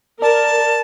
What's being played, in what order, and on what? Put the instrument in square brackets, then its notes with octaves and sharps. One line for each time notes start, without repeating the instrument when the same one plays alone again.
[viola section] A#4 [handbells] D5 [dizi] A5